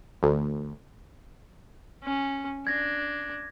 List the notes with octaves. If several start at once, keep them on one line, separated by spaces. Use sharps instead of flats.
D2
C#4
D4 G#6 A#6